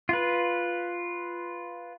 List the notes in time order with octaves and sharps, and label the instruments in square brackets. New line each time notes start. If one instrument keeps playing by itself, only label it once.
[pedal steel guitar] F4 B4